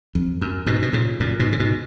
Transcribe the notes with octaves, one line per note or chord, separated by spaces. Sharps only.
F2
F#2
G#2 B2
B2
A#2 C#3
F#2 A#2
G#2 B2
C#3
G#2 B2